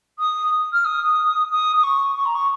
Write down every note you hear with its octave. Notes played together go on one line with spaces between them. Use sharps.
D#6
F6
D#6
D#6
D#6
C#6
C#6
A#5
C#6